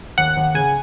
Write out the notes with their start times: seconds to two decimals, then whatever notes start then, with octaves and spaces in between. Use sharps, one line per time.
0.18 D#2 F#5
0.37 D#2
0.54 C#3 G#5